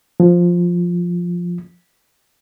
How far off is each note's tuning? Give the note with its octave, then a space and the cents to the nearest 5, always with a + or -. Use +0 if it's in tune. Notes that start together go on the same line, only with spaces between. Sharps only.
F3 +5